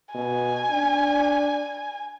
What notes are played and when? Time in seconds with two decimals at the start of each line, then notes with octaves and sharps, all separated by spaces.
0.15 B2 G#5
0.71 D4